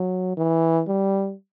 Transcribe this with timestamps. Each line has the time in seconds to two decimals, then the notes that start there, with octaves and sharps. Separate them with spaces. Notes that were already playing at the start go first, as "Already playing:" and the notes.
Already playing: F#3
0.37 E3
0.88 G3